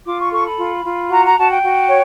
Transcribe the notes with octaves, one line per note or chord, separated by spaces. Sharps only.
F4 D6
C#6
A4 C#6
B5
F4
F4
F#4 A#5
A#5
F#4 A5
G5
F#4
C#5